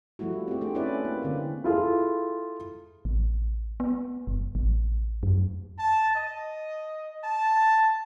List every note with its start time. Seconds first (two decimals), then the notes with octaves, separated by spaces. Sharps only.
0.19 F3 G3 A3 E4 F#4
0.48 C4 G4
0.61 A3 D4 G#4
0.75 C#4 E4 G#4 B4 D5
1.05 A#3
1.23 D3 C4
1.64 E4 F4 G#4 A4
3.05 A1
3.80 B3
4.27 F#1
4.55 A1
5.23 F#2
5.78 A5
6.14 D#5
7.23 A5